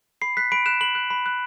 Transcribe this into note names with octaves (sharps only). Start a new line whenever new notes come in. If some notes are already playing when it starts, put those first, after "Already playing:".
B5 C7
F#6 B6
B5 D7
F#6 E7
B5 F#7
F#6
B5
F#6